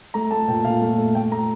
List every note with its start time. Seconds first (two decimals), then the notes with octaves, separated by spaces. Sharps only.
0.14 A3 A#5
0.31 A3 A5
0.48 A#2 G5
0.65 A#2 F5
0.82 A3
0.98 A3
1.15 A3 G5
1.32 A3 A#5